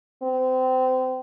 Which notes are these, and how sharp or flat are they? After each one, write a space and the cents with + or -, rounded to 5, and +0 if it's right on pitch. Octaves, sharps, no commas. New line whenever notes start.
C4 -25